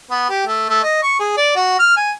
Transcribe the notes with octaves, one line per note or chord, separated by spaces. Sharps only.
B3
G4
A3
A3
D#5
C#6
G#4
D5
F#4
F6
G#5